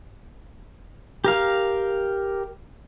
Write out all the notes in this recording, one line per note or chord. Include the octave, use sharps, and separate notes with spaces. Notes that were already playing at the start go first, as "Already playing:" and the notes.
G4 A#4 F5